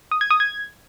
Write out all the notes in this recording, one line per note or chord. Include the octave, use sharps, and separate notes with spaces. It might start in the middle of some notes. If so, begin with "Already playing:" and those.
D#6
G#6
D#6
G#6